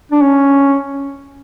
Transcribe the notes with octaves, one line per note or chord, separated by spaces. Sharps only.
D4
C#4